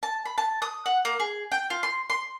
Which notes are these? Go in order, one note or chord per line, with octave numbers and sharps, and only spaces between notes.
A5
B5
A5
D#6
F#5
A#3
G#4
G5
F4
C6
C6